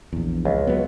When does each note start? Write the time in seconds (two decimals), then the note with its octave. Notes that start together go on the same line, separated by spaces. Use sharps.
0.13 A#1 E2
0.45 C#2
0.67 F#3 B3